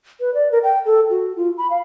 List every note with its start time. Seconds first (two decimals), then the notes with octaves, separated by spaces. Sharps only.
0.20 B4
0.34 D5
0.52 A#4
0.63 G5
0.86 A4
1.10 F#4
1.36 F4
1.58 B5
1.70 F5